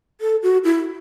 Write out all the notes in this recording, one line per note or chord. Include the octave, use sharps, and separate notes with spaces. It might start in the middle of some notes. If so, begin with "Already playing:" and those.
A4
F#4
E4